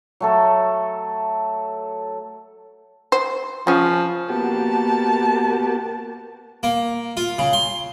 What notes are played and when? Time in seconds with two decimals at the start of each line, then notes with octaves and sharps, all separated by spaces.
0.20 F#3 A3 A4
3.12 C5
3.67 C#3 F3 C#4
4.30 A#3 B3 F#4 G4 A5
6.63 A#3
7.17 F4
7.39 C#3
7.53 C6